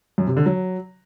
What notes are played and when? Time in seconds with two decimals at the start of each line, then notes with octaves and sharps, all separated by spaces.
0.18 F#2
0.27 C3
0.37 D3
0.46 F#3